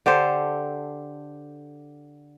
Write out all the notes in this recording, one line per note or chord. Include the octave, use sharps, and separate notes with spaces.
D3 G4 A4 C5